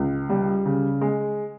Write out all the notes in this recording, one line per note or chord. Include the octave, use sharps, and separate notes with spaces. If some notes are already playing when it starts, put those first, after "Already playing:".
Already playing: C#2
G3
C#3
G#3